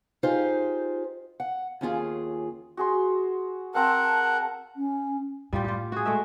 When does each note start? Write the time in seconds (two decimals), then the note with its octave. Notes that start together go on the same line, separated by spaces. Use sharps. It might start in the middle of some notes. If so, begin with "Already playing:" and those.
0.23 D#4 F4 G4 G#4 C5
1.40 F#5
1.81 D#2 C#4 F4 G#4
2.77 F#4 G#4 C6
3.75 C4 A#4 F5 F#5 A5
4.76 C#4
5.53 A2 G3 F4 G4
5.64 F4 G4
5.92 F#4 G#4
6.05 G#3 A3 E5